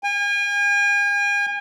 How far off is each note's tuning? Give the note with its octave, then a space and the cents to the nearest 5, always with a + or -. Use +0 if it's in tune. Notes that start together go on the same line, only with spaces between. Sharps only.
G#5 -40